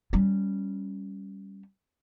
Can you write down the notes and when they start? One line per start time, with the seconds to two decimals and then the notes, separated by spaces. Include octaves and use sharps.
0.13 G3 C#4